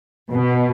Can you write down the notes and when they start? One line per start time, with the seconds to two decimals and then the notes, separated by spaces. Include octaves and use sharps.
0.30 B2